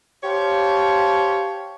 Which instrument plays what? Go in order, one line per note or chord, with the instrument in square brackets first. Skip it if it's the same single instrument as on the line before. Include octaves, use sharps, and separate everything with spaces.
[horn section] G4 C5 C#5 F5 A5